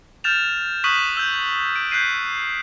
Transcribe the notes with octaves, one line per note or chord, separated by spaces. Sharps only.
F6 G6 A6 E7 F7
C#6 D#6 F#6 B6 D#7 F#7
E6 G6
D7
F#6 G6 B6 C7 D#7